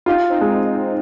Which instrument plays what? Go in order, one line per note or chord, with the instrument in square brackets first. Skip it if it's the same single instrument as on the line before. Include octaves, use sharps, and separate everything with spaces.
[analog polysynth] D#4 G4 [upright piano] F4
[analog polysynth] C4 D#4
[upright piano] G#3